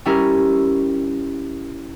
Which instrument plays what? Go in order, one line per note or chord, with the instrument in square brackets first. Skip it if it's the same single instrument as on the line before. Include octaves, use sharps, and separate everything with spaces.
[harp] G3 C#4 E4 A#4